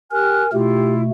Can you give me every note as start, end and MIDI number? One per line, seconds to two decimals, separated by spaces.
0.11 0.42 67
0.11 0.51 70
0.11 0.50 80
0.11 0.42 89
0.11 0.42 90
0.53 1.10 47
0.53 1.10 57
0.53 1.01 64
0.53 1.01 65
0.53 0.93 67